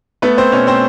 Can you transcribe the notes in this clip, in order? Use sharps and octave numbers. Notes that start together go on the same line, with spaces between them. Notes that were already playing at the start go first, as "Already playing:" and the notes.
A3 B3 B4
C4 C5
B2 C#4 C#5
A3 C4 C5